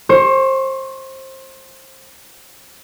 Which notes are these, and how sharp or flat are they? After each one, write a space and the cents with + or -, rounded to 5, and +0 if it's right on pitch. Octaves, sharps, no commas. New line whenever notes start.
C5 +25 C#6 +0